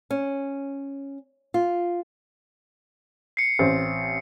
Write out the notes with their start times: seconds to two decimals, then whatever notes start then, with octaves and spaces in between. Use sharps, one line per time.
0.11 C#4
1.54 F4
3.37 C7 C#7
3.59 A1 C4